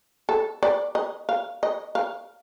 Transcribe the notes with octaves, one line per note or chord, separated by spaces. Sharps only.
A4
D5
D#5
F5
D#5
F5